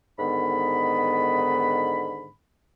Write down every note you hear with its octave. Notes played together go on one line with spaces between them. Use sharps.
G#2 D3 D#3 B3 B5